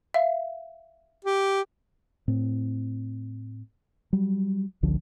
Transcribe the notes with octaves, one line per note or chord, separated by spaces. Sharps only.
E5 F5
G4
A2 C4
F#3 G3
G#1 C#2 D3 F3